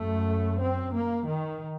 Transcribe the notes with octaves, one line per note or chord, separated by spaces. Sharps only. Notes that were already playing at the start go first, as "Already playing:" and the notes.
Already playing: F#2 A3
C4
A#3
D#3